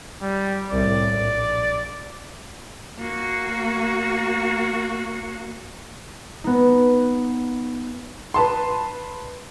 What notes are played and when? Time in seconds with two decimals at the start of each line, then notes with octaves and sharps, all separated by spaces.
0.21 G3
0.71 C2 A2 D5
1.13 A#1
2.99 A#3 F#4
6.44 B3 D#4
8.34 B4 A5 C6